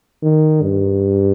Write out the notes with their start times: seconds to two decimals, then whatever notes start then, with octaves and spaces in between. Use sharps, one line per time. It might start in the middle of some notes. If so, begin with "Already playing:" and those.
0.23 D#3
0.62 G2